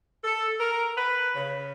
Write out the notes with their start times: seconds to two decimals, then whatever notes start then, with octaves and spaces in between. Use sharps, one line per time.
0.23 A4
0.60 A#4
0.96 B4
1.35 C#3